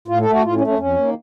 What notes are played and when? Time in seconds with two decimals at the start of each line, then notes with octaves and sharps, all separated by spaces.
0.08 A2 F4
0.21 A3 A4
0.31 F#4
0.43 A2 F4
0.55 C#4
0.61 A3
0.67 C#4
0.78 F2 C#4
0.97 D#3 A#3